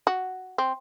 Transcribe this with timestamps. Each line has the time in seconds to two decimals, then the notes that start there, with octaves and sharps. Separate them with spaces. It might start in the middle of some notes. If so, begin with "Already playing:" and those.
0.07 F#4
0.58 C4